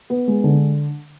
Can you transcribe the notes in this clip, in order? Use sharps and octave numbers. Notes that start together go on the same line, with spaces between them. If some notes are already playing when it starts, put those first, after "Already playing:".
B3
G#3
D3